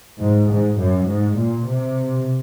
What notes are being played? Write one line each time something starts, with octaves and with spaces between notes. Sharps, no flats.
G#2
G#2
F#2
G#2
A#2
C3